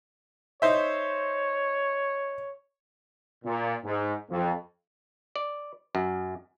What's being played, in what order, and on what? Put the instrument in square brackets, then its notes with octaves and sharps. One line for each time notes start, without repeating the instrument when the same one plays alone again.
[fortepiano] D#4 C5 E5 [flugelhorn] C#5
[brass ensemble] A#2
G#2
F2
[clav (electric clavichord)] D5
F#2